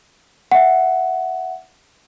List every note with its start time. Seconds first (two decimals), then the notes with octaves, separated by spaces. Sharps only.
0.52 E5 F#5